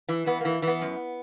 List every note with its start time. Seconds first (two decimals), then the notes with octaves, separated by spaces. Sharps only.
0.09 E3
0.26 E3 B3
0.41 E3 A#3
0.62 E3
0.67 B3
0.81 F#2